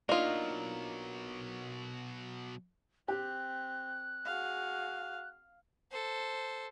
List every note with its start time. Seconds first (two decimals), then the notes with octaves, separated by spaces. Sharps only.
0.09 B2 F#3 A#3 D4 D#4 F4 D#5
3.08 C4 G4 F#6
4.25 F#4 G#4 F5
5.92 A4 C5